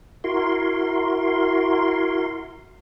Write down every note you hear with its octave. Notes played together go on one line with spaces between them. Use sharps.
E4 F#4 A#4 C6